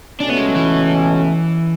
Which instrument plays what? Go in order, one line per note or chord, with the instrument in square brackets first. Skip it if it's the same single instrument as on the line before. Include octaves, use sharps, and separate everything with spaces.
[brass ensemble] C#2 B2 A3 C#4 [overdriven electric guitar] D4
[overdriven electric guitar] B3
G#3
F#3
E3